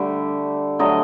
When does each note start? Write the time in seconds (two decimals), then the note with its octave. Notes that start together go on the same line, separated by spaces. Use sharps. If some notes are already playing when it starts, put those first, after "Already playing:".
Already playing: D3 G3 A3
0.79 D3 F#3 A3 D#5